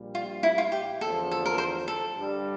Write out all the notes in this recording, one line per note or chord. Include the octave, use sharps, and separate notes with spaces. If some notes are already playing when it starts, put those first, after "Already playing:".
Already playing: A#1 A#2 G3
F4
E4
F4
G4
E2 D3 F3 A4
A4
A#4
C5
A4
G2 D3 G3